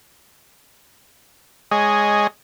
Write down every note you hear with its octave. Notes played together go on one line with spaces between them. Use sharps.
G#3 G#4 C#5 D#5